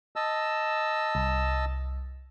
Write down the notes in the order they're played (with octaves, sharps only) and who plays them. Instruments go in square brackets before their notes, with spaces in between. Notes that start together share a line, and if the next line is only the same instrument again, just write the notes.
[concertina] D#5 A5 E6
[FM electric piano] C2